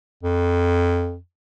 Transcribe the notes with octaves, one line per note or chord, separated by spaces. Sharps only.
F2